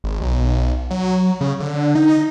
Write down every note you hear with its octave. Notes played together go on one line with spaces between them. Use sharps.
G#1
B1
F#3
C#3
D3
D#4